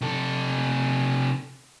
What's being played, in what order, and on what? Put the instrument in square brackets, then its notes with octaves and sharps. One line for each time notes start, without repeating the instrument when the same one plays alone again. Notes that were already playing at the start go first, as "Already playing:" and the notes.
[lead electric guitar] C3 A4